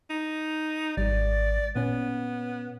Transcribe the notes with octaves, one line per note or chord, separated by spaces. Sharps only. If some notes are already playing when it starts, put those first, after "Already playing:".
D#4
G#1 G3 D5
A#2 B3 C#4